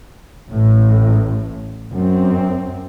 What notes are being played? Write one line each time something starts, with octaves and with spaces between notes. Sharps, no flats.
A1 A2
F#2 C4